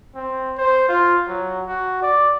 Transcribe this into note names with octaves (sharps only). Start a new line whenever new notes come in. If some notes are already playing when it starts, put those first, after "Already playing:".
C4
C5
F4
F#3
F#4
D5